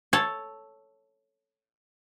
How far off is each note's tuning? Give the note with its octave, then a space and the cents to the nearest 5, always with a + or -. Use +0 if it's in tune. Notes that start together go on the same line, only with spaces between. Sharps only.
A4 +0 C#5 +0 A5 +0